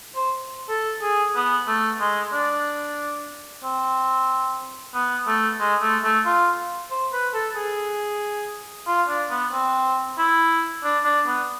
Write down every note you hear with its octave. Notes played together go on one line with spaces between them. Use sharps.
C5
A4
G#4
B3
A3
G#3
D4
C4
B3
A3
G#3
A3
A3
F4
C5
B4
A4
G#4
F4
D4
B3
C4
E4
D4
D4
B3